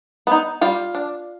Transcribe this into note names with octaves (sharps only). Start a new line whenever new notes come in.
B3 D#4
G3 F4
D4